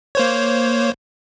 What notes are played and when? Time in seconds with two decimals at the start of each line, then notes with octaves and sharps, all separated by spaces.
0.15 A#3 C5 C#5